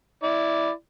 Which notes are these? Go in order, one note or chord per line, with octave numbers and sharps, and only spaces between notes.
E4 D5